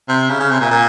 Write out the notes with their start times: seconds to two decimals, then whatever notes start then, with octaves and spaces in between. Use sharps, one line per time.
0.09 C3
0.29 C#3
0.40 C#3
0.51 C3
0.60 A#2
0.71 A#2